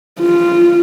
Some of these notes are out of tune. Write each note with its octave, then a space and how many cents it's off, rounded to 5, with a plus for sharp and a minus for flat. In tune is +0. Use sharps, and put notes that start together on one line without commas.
F4 -15